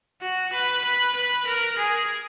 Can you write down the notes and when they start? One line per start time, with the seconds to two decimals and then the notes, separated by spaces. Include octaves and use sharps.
0.21 F#4
0.53 B4
0.84 B4
1.15 B4
1.47 A#4
1.78 G#4